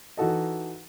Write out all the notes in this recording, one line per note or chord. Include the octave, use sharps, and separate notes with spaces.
E3 D#4 F#4 A4 D#5